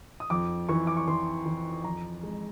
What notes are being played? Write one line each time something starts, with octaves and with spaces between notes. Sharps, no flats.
D#6
F2 D6
E3 C#6
D6
C#6
E3 C6
E3
F2 A#5
G#3